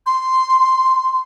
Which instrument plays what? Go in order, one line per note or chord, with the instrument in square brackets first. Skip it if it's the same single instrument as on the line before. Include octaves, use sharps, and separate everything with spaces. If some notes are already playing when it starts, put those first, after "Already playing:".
[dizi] C6